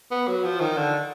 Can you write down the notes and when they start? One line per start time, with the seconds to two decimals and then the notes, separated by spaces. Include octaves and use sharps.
0.11 B3
0.27 F#3
0.44 F3
0.60 D#3
0.77 D3